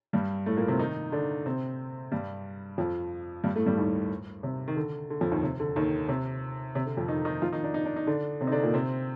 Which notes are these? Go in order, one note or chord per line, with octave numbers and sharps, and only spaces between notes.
G2 G3
A2 A3
A#2 A#3
C3 C4
D#3 D#4
D3 D4
C3 C4
G2 G3
F2 F3
G2 G3
A2 A3
G2 G3
D#2 D#3
C3
D#3
D3
D3
F2 F3
D#2 D#3
C3
D3
D#2 D#3
C3
C3
D3
F2 F3
D#3 D#4
D#3 D#4
F3 F4
D#3 D#4
D4
D#4
D4
D#4
D3 D4
C3 C4
D#4
D3 D4
A#2 A#3
C3 C4